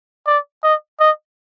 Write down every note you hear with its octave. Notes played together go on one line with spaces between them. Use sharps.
D5
D#5
D#5